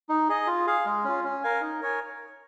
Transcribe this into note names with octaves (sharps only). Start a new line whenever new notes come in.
D#4
G#4 D#5
F4
G#4 F5
G#3
C#4 F4
C#4
A#4 F5 G#5
D#4
A#4 C#5 G#5